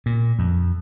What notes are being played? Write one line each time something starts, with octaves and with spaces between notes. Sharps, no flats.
A#2
F2